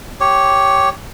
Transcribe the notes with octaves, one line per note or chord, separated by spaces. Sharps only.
G4 C#5